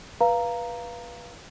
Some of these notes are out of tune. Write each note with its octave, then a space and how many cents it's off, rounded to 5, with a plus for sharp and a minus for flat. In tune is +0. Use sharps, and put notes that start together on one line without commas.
B4 -20 F5 -10 A#5 +0